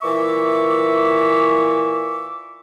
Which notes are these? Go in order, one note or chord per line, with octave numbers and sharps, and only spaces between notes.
A#2 E3 E5 C#6 D6